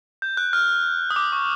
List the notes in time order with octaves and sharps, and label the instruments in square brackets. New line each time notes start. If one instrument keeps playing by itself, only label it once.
[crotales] G6
F#6
F6
D#6
D6
C#6